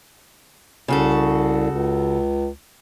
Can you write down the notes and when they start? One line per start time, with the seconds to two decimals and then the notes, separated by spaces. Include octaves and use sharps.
0.88 C2 C#3 F#4 A4
1.71 C#2